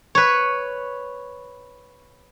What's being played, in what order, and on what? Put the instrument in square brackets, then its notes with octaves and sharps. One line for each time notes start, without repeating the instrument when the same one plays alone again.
[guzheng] B4 C#5